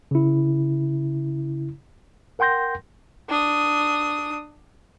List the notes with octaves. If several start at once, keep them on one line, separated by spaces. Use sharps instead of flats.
C#3 E4
A#4 F#5 G5 C6 G6 A#6
D4 D#6